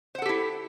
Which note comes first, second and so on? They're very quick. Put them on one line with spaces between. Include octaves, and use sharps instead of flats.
C5 F#5 A4 G4 E4